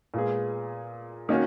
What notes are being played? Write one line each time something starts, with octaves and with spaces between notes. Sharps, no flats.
A#2 G#3 B3 F4 G#4
D#3 A#3 C#4 F#4